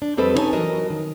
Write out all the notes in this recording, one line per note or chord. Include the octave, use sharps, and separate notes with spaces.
D4
F2 G3 C4 A4 B4 D#5
C#4 D#4 E4 C#5 G#5 A5
E3 F#3 A#4 D#5 A5
D#3